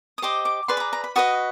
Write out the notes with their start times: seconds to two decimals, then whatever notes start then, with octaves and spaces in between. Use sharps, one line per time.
0.18 D#6
0.22 G4 C5 D#5 D6
0.45 D6
0.68 G#4 B4 D5 C6
0.77 B5
0.80 A#5
0.93 A#5
1.04 B5
1.16 F#4 B4 D#5 D#6